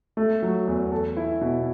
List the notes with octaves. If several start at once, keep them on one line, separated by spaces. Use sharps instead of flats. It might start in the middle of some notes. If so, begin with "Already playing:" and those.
A3
F#3
E2
A4
E4
B2